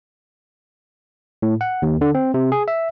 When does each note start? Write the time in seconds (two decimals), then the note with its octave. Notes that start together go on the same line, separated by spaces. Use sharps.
1.42 A2
1.61 F#5
1.82 D#2
2.01 D3
2.15 C4
2.34 C3
2.52 G#4
2.68 E5